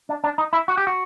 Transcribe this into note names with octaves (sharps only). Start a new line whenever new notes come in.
D4
D4
D#4
E4
F#4
G4
F#4